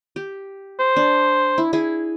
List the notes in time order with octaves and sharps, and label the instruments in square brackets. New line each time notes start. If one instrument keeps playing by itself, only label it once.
[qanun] G4
[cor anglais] C5
[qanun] D4
E4
E4 G#4